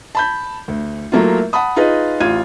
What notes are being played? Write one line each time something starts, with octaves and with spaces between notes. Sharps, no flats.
A5 B5 G6
D2
F#3 A3 A#3 E4 F4
F#5 A5 B5 D#6
D#4 F4 G#4 B4 D#5
A1 F4 G#6 D#7